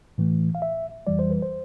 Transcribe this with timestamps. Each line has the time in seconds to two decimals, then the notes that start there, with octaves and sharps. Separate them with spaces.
0.18 A2 E3 A3
0.55 F5
0.62 E5
1.07 F2 E3 G3 D5
1.19 C5
1.30 B4
1.42 C5